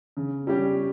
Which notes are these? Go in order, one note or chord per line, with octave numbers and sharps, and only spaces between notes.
C#3
G3 C#4 G4